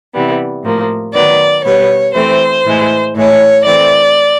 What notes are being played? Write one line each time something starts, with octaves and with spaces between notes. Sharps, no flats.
C3 E3 G3 B3
A2 F3 A#3
D#3 F#3 B3 D5
B2 G3 B3 C#5
E3 A3 C4 C5
A2 E3 G#3
A2 E3 G#3 C#5
E3 A3 C4 D5